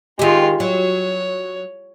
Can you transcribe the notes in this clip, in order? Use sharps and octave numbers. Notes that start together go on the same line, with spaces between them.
D#3 G#3 F4 G4
F#3 C#5